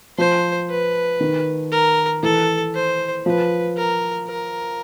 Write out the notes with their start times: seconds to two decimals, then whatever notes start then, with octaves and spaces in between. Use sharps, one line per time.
0.18 F3 C5
0.69 B4
1.20 D#3
1.71 A#4
2.23 E3 A4
2.75 C5
3.26 F3 B4
3.77 A#4
4.28 A#4